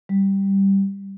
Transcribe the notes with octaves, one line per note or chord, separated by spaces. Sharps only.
G3